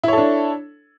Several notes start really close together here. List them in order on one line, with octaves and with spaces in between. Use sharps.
E4 C#5 A4 D4